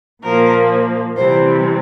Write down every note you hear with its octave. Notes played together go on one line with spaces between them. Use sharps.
A#2 F3 A#3 A#4
C3 E3 G3 C4 C5